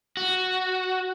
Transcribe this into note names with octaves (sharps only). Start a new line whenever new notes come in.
F#4